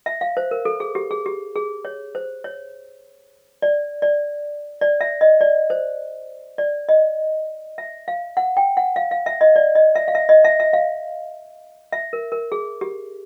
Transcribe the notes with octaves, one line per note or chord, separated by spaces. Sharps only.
E5
F5
C5
A#4
A4
G#4
G4
G#4
G4
G#4
C#5
C5
C#5
D5
D5
D5
E5
D#5
D5
C5
D5
D#5
E5
F5
F#5
G5
F#5
F5
F5
E5
D#5
D5
D#5
E5
F5
E5
D#5
E5
E5
F5
E5
A#4
A#4
G#4
G4